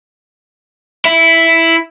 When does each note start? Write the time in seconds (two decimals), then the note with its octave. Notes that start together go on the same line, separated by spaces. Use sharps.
1.05 E4